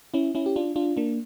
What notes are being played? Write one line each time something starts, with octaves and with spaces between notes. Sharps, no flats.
C#4 E4
C#4 E4
G4
D4 F4
D4 F4
A#3 D4